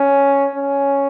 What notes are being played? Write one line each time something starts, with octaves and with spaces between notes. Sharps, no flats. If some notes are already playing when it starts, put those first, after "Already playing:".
Already playing: C#4
C#4